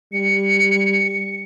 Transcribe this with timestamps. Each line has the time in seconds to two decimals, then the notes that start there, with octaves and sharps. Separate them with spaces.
0.13 G3 C#7